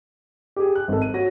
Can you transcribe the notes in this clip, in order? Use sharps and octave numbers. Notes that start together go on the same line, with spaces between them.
G4 G#4
F#6
G#1 A4
D#7
F#4 C#5 A#6